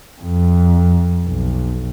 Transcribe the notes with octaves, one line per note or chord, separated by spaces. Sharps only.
F2
B1